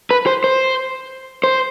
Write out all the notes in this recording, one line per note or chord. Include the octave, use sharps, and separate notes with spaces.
B4
C5
C5
C5